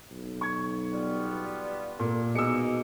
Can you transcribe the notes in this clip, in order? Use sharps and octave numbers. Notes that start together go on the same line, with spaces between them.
B1
C#6 G#6
G3 B3 F4
A#2 A3
B2 G#3 A#3 D#4 E6 C#7